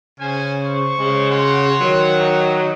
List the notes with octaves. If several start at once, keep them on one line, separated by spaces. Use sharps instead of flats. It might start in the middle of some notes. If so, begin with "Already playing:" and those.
C#3 C#4 C5 G#5
C5 C#6
C#3 G#3
F#4 C#5 F#5 C6
D#3 F#3
D#4